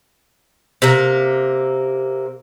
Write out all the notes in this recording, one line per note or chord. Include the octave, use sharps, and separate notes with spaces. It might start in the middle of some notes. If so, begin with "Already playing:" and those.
C3 A#3